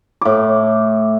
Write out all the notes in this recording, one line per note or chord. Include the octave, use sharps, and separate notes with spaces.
A2 D6